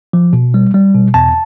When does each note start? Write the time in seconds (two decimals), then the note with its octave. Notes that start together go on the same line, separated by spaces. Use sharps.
0.13 F3
0.33 B2
0.54 G3
0.74 G3
0.94 B2
1.14 E2 A5